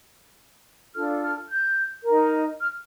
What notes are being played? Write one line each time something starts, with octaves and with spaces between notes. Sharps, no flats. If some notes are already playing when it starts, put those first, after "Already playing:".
D4 F4 A4 F6
F6
G6
A#4
D#4
F6